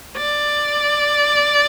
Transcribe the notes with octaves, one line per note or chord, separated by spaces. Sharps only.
D5